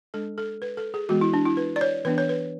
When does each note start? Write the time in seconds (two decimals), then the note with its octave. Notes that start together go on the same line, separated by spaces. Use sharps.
0.14 G#3 D4 A4
0.38 A4
0.62 B4
0.77 A4
0.94 G#4
1.09 E3 G#3 B3 F#4
1.21 E4
1.34 D4
1.46 E4
1.57 B4
1.76 D5
1.81 C#5
2.05 E3 B3 D4 B4
2.18 C#5
2.29 B4